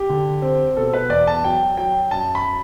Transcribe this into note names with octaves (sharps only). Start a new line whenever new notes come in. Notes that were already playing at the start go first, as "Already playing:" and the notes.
Already playing: G4
D3
C4
B2 A4
B4
E2 D5
A5
F#3 G5
F#3 G5
F#2 A5
B5